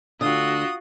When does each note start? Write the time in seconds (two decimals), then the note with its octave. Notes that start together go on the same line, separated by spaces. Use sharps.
0.21 D2 D3 F4 F#4 D#6